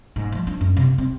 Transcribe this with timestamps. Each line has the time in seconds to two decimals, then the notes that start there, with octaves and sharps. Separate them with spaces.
0.16 G#2
0.32 F3
0.47 D4
0.61 F#2
0.77 C3
0.98 C4